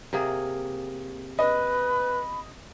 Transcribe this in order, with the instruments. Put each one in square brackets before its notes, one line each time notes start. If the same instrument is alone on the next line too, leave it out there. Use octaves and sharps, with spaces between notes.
[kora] C3 A#3 G#4
[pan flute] B4 [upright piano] D#5 [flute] B5